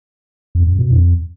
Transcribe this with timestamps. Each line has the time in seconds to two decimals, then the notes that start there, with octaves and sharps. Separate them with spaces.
0.55 F2
0.67 F#2
0.79 B2
0.90 F2